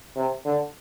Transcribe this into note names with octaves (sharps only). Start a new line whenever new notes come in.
C3
D3